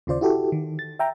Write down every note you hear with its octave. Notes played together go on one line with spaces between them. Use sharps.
D#2 C#3 F4 C5 D5
E4 F#4 G4 A4
D#3
A6
E5 G5 A#5